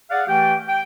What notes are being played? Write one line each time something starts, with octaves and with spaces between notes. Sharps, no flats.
G#4 D5 F5 F#5
E3 A3 G4 G5
G5